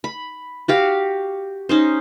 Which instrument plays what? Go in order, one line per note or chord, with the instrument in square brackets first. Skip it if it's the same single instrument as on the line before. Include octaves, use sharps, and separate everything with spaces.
[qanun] B5
F#4 G4 F5
C#4 D#4 C5